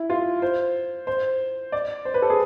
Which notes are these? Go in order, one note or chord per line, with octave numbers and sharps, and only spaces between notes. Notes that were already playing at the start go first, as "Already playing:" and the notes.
Already playing: E4
F4
C5
C5
D5
C5
B4
A4
G#4